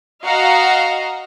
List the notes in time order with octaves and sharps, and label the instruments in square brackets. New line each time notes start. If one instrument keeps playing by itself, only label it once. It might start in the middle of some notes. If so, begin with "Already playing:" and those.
[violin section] F#4 D#5 F5 F#5 A#5